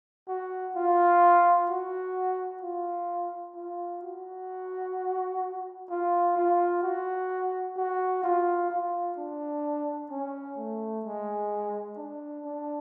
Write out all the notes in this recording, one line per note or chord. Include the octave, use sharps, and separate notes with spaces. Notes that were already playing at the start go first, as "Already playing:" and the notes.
F#4
F4
F#4
F4
F4
F#4
F4
F4
F#4
F#4
F4
F4
D4
C#4
A3
G#3
D4
D4